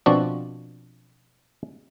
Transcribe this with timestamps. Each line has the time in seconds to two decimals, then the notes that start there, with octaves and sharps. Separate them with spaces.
0.06 B2 F3 C4 D4 F#4